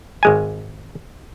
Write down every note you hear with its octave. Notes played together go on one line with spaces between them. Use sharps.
G#1 G#3 G#5